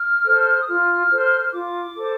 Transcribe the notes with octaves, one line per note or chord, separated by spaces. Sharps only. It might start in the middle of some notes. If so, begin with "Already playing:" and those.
Already playing: F6
A4 C5
D#6
F4 F6
A4 C5
F4 D6
A4 C5